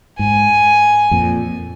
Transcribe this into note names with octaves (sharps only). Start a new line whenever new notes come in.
G#2 G#5
F2 A#2